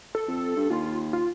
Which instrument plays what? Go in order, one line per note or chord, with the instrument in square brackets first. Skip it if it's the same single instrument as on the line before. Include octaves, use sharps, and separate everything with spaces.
[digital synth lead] A4
[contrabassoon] F2
G2
[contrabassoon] D#2 [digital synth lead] F4
[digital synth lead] F4